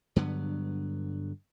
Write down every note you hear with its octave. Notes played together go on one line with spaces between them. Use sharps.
G2 D3 F#3 B3